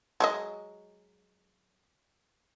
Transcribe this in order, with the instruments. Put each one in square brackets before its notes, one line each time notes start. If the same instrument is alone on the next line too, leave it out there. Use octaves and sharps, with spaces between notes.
[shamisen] F#3 G#3 D#5